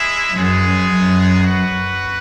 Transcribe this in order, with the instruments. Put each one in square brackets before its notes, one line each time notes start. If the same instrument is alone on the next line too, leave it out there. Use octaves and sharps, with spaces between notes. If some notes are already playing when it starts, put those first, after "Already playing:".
Already playing: [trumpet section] G#3 E4 G#4 E5
[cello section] F#2 [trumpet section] G#3 B3 G#4
[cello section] F#2
[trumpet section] F#4 B4 F#5